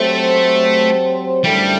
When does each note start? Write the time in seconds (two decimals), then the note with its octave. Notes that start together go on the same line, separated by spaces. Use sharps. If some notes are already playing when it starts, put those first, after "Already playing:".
Already playing: F#3 A3 C4 G4 C5
1.43 F#2 D3 G3 A3 E4 A4